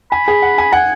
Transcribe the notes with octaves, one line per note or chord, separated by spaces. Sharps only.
G#5 B5
G#4
F#5
G#5
F#5 G#5